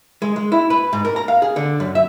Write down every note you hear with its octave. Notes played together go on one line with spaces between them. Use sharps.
G#3
G#3
E4
B4
G#2
A#4
A#5
F5
G#4
D3
F#2
E5